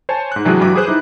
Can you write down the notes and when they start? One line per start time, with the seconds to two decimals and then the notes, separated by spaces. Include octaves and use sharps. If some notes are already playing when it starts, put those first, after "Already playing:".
0.09 C5 C#5 G#5 A5
0.32 G#2 F#6
0.45 C3 E3 F#3 G#3 D4
0.61 G2 E3 F#3 G3 G4 D6
0.75 G#4 B4 C5 F#6
0.87 G3 D#4 E4